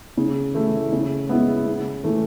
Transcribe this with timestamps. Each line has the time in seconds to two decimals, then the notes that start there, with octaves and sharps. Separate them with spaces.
0.17 C#3
0.54 E3 A3 E4
0.92 C#3
1.29 G#3 B3 E4
1.67 C#3
2.04 E3 A3